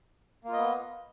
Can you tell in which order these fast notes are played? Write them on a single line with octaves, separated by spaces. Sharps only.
A#3 F4 D#5 B3